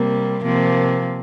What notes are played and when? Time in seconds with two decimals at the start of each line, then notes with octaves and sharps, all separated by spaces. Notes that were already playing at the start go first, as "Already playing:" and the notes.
Already playing: C3 G3 A#3
0.43 C3 F3 A#3